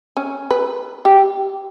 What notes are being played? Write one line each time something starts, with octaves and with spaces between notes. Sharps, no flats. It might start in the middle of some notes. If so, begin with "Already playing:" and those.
C#4
B4
G4